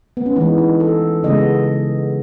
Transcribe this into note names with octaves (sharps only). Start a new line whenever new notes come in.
B3
C#4
E3 G#3 B3 D#4
D#4
A4
C#3 G#3 B3 D#5